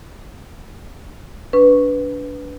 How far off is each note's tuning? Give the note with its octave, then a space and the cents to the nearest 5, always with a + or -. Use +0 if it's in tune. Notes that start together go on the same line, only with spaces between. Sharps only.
D4 -25 B4 +0 C#6 -5